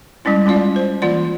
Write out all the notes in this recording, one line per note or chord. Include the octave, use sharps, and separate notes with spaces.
G3 G#3 C#4 E4
G#3 C#4 F4 D5 F5
C5
E3 A#3 F4 D5